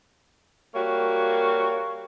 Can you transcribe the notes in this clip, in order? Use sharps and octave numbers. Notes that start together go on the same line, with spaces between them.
G3 A#3 F#4 C#5